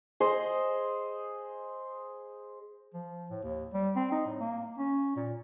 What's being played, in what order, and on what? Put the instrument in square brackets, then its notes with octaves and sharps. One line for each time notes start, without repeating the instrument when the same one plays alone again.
[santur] G#4 C5 D#5
[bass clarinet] F3
A2
D#2
G3
C4
D#4
A2
A#3
C#4
A#2